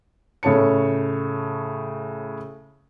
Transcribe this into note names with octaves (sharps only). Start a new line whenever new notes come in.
A2 C#3 C#5 A5 C#7